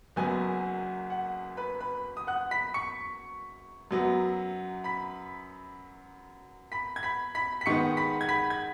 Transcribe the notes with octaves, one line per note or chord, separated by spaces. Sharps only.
F#1 F#2 F#3 B3 G#5
F#5
B4 B5
B4 B5
D#6
F#5 F#6
B5 B6
C#6 C#7
F#2 F#3 B3
B5 B6
B5 B6
G#6
B5 B6
B5 B6
B6
G#2 D#3 G#3 B3 C#6 C#7
B5 B6
G#6
B5 B6
G#6